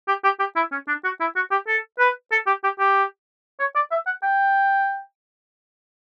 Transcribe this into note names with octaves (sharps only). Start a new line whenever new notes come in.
G4
G4
G4
E4
C#4
D4
F#4
E4
F#4
G4
A4
B4
A4
G4
G4
G4
C#5
D5
E5
F#5
G5